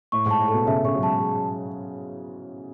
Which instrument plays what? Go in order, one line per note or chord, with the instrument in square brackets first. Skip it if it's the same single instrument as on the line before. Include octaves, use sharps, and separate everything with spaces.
[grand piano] A2 [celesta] C#6
[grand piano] G#2
[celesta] A5
[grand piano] A2
[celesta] A4
[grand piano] B2
[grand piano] C#3 [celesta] E5
[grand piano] C#3 [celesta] C#6
[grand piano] F#3
[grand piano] G#3 [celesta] A5
[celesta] G#4